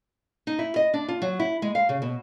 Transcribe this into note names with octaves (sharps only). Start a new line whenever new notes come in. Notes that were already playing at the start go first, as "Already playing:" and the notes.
D#4
E4
D#5
D4
F4
F#3
E4
G#3
F5
C#3
B2